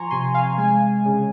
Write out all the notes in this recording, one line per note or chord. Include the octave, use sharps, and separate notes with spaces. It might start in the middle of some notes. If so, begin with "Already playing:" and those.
Already playing: F3 G#5 A#5 C6 C#6
C3 G#5 C6
F5 G#5
G#3 F5 G#5
C#3